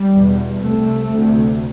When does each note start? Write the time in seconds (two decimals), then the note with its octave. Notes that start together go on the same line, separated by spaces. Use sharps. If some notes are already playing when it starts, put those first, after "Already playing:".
Already playing: G3
0.13 E2 B2
0.62 C2 C3 A3
1.12 D2 C3